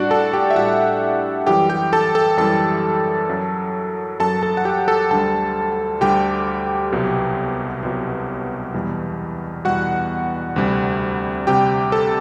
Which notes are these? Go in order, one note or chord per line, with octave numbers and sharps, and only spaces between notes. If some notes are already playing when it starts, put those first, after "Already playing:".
Already playing: A2 G3 D4 F#4 D5 F#5
A4 A5
G4 G5
E5
A2 G3 F#4 F#5
F#2 E3 G3 G4 G5
G4 G5
A4 A5
A4 A5
F#2 E3 G3 A4 A5
F#2 F#3
F#2 F#3 A4 A5
A4 A5
F#5
G4 G5
A4 A5
D2 D3 G3 A4 A5
D2 D3 G3 G4 G5
C2 B2 F#3
C2 B2 F#3
E2 B2 G3
E2 B2 G3 F#4 F#5
D2 C3 G3
D2 C3 G3 G4 G5
A4 A5